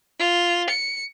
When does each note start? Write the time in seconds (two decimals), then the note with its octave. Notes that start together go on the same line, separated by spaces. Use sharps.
0.19 F4
0.70 C#7